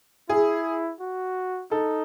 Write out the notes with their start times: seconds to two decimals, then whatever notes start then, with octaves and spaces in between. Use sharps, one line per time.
0.29 E4 G#4
1.00 F#4
1.71 D#4 A4